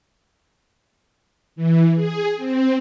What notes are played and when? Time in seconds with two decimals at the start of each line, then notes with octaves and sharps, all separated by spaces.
1.56 E3
1.95 G#4
2.36 C4